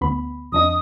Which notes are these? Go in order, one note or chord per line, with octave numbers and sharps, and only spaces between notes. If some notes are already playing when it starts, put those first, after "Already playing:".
D2 B3 B5
F2 D4 D#5 D#6